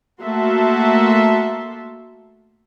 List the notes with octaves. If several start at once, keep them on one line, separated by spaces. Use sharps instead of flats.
A3 A#3 F#4 E5 A5 C6